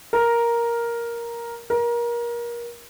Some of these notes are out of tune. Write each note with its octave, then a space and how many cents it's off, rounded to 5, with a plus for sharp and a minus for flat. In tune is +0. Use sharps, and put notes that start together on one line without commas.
A#4 +5
A#4 +25